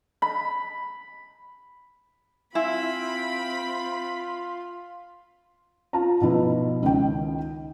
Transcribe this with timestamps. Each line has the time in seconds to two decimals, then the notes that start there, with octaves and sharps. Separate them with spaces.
0.22 B5
2.55 C4 E4 F4 E5 G#5 B5 C6
5.93 F4 A5 A#5
6.21 B2 F3 D#4 E4 B4
6.82 C#2 D#3 G5